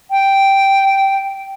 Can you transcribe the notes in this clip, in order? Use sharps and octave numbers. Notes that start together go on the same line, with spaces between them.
G5